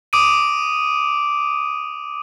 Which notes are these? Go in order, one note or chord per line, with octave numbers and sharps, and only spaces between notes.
D6 D#6 D7 D#7